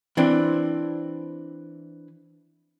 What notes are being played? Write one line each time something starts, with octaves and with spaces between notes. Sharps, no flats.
E3 C4 D4